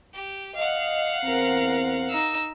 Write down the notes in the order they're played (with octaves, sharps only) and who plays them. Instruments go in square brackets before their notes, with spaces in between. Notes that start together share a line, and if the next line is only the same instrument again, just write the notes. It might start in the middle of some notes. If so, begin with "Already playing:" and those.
[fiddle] G4
[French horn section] D#5 [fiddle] F5 F#5
[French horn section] E2 C4 [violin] A#4
[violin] D#4 E6